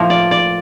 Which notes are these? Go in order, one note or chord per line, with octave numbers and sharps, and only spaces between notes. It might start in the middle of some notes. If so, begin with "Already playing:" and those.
Already playing: A2 F3 A#3
D5
D5